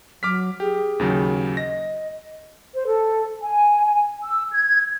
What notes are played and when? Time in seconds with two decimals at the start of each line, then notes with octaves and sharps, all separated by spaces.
0.23 F#3 D6 F6 B6
0.60 G4 G#4
1.00 D#2 C#3 F#3
1.57 D#5 A#6
2.74 C5
2.87 A4
3.43 G#5
4.24 E6
4.52 G#6